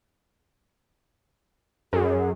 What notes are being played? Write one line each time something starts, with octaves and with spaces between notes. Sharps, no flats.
F#2 G#4